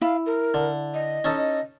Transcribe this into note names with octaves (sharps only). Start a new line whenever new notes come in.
E4 F5
A#4
D3
D#5
C#4 D#4 A4